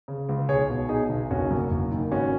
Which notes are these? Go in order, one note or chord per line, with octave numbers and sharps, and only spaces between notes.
C#3
C#2
B1 G#4 C#5
B2
B2 D#4 G#4
B1
F#1 C#4 F#4
F#2
F#1
D#3
G#1 C#4 F#4